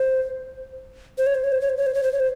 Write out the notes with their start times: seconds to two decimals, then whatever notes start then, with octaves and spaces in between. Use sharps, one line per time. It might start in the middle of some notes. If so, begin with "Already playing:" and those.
Already playing: C5
1.18 C5
1.26 C#5
1.35 C5
1.44 C#5
1.52 C5
1.61 C#5
1.69 C5
1.77 C#5
1.86 C5
1.94 C#5
2.03 C5
2.13 C#5
2.20 C5